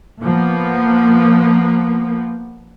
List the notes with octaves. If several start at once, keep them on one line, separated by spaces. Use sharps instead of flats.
F3 A#3 B3